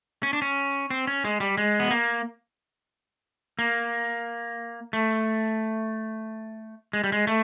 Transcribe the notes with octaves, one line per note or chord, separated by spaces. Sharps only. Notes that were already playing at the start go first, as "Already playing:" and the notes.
C#4
D4
C#4
C4
C#4
G#3
G3
G#3
B3
A#3
A#3
A3
G#3
G3
G#3
A3